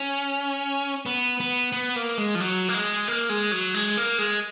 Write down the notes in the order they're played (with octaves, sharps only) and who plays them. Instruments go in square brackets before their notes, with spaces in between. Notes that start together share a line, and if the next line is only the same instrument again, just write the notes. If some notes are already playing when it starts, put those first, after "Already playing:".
Already playing: [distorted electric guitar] C#4
B3
B3
B3
A#3
G#3
F3
F#3
A#3
G#3
A#3
G#3
F#3
G#3
A#3
G#3